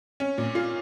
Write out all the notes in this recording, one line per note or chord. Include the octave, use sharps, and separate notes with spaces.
C#4
A#2
F4